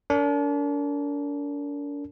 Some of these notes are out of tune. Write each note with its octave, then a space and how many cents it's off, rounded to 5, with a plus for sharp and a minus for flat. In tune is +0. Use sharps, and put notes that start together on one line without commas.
D4 -40 A#4 -20